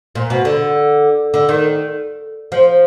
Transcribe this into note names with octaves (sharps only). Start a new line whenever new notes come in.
A#2
B2
D3
D3
D#3
F3